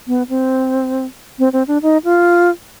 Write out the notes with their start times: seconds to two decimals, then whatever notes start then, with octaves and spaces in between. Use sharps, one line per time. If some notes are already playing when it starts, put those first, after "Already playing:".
0.08 B3
0.29 C4
1.39 C4
1.53 C4
1.68 D4
1.82 D#4
2.04 F4